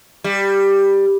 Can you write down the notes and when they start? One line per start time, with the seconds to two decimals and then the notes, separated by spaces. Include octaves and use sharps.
0.24 G3